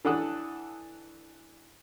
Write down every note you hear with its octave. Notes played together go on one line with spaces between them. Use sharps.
E3 D4 A4 F#5 D#6 F#6